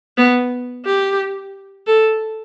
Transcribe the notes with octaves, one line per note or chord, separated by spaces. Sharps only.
B3
G4
A4